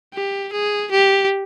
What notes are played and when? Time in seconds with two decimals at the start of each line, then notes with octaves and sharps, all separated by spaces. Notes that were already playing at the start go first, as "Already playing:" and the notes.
0.14 G4
0.52 G#4
0.91 G4